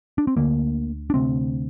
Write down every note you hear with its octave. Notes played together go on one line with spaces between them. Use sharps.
D4
C4
D2 D3 A#3
D4
D2 C3 C4